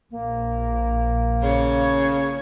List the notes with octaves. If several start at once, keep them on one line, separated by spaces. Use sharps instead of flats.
A#1 A#3
C#3 C#5